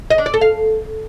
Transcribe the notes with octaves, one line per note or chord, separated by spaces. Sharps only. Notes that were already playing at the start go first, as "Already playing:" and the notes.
D#5
D4
D5
A4
F5